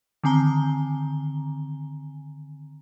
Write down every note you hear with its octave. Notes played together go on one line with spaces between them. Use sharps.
D3 D#3 C4 G#5 A#5 G7